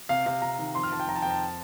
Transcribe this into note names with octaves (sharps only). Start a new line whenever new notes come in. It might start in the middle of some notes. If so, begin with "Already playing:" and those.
C3 F5
C3 F5
C3 A#5
D#3
F2 C6
F6
F2 A5
G5
F2 A#5
A5
G5
F2
A5